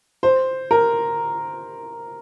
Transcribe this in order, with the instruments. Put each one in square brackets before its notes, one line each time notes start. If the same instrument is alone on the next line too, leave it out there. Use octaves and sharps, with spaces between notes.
[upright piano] C5
A#4